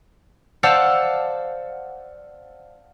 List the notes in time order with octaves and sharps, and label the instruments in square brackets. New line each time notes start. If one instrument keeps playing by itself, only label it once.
[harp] C5 D5 F5 F#5 A5 E6